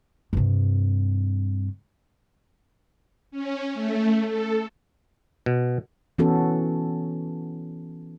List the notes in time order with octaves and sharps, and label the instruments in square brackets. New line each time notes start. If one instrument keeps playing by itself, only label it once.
[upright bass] G2 C3
[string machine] C#4
A3
A4
[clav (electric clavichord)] B2
[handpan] E3 B3 C#4 F#4 A4